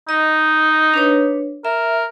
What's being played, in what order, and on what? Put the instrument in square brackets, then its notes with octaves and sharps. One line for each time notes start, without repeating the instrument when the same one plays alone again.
[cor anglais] D#4 [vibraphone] D#5
[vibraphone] D4 B4 C#5
[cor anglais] A#4 [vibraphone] E5